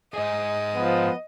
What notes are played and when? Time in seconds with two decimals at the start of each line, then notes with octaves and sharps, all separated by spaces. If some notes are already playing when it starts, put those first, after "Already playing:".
0.14 G#2 G#4 D#5
0.75 F3 B3